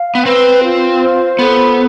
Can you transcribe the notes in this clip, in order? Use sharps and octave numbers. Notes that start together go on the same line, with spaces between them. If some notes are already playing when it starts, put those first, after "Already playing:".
Already playing: F5
B3
C4 B4
F4
C5
B3 A4